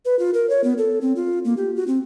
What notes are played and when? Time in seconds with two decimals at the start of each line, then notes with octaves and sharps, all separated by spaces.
0.05 B4
0.19 F4
0.34 A#4
0.50 C#5
0.64 B3
0.78 A4
1.01 C4
1.16 F4
1.45 A#3
1.57 G4
1.76 F#4
1.88 C4